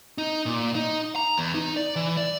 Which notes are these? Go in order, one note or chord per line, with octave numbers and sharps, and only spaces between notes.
D#4
A#2
D#4
A#5
E2
D#4
D5
E3
D5